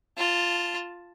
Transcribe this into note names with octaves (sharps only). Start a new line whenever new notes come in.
F4 A5